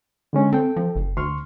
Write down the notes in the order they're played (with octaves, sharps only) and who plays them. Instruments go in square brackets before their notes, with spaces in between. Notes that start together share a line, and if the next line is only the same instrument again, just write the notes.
[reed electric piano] D3 G#3 C#4
[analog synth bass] C4 [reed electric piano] A4 G5
[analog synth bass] F3
F#1
[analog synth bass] D2 [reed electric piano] C6 C#6 F6